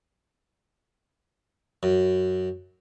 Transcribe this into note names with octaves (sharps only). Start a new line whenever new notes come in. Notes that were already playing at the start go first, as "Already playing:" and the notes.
F#2